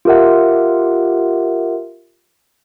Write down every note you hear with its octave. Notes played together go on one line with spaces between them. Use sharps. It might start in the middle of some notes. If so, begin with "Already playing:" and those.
F4 G4 A#4 E5 F#5